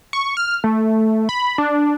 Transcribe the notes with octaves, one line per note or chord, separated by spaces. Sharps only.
C#6
F6
A3
B5
D4